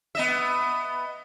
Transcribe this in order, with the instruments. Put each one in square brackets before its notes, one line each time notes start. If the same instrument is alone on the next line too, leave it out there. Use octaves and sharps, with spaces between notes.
[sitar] B3 D#5 E5